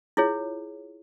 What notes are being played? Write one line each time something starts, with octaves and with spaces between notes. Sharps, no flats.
E4 F4 G#4 C#5